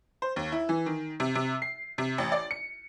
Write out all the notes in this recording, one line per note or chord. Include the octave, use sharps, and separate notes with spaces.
C5
D#2
E4
E3
D#3
C3
C3
C7
C3
A1
D5
C#7